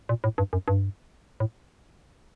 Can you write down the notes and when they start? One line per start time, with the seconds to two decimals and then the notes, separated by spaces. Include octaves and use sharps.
0.09 A#2
0.24 A2
0.38 G2
0.53 F#2
0.68 G2
1.40 A2